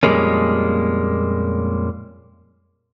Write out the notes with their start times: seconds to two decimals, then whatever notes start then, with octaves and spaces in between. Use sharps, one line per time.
0.03 F2 A#2 G3 G#3 A#3 C#4